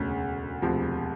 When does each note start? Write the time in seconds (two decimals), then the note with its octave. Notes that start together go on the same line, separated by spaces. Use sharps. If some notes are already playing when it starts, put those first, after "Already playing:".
Already playing: E1 D2 C#3
0.62 E1 D2 C3 F3